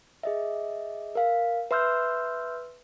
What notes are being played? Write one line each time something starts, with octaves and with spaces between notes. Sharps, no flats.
G#4 D#5 E5
A#4 F5
B4 E5 C6 E6 F6 G6